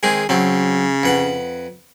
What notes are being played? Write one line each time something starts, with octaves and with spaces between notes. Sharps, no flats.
D#3 G#3 C4 G#4
C#3 F#3 C4
F2 B4 F#5